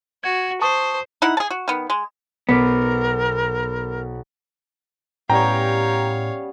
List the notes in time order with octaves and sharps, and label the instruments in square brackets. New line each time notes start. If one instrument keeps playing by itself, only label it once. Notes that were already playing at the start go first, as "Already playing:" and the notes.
[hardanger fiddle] F#4 [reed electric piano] G#6
[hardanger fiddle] C5 [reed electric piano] A5 C#6 D#6
[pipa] D#4 E4 F#5
G#4 A5
F#4
D#3 B3
G#3
[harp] B1 C5 D6 [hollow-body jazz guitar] B3 [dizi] A#4
[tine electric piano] A2 [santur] G3 B3 C#4 [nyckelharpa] C#5 F5 [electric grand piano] G5 A#5